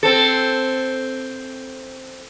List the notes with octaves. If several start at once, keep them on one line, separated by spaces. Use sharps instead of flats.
C4 A4